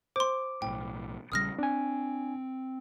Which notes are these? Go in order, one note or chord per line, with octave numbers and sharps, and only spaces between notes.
C5 C6 D6
B1 A2 G5
A#1 C#3 G3 D#6 F6 A#6
C4 D4 G#5